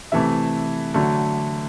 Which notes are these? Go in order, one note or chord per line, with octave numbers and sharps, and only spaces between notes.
C3 E3 A3 E5
D3 F#3 A3